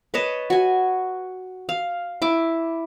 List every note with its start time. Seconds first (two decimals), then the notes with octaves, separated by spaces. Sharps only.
0.14 B4 C#5 D#5 A5
0.50 F#4 G#5
1.69 F5
2.22 E4 D6